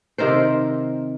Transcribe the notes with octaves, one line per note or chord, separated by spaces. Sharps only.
C3 D#3 A#4 C5